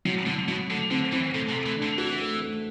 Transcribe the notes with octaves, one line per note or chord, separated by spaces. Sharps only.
C3 F#3
D3 F#3
B2 F#3
D3 A3
D3 C4
E3 C4
C3 A3
C3
A3
E3
D4
D3
E3 F#4
A3
A3